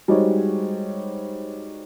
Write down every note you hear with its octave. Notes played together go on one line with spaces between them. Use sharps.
G3 G#3 D#4 F#4 C5 C#5